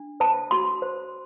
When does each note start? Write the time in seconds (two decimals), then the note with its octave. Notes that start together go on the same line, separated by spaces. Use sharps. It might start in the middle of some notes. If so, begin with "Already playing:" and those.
Already playing: D4
0.20 C5 A5
0.51 F#4 C6
0.82 C5